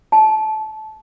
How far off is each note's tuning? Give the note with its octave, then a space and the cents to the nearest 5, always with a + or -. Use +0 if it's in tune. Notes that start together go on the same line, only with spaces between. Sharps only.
A5 -20